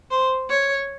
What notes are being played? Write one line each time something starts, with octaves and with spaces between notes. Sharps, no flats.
C5
C#5